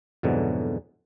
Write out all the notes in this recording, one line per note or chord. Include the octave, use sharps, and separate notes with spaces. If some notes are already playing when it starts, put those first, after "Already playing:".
F2 G#2 B2 D3 E3 F#3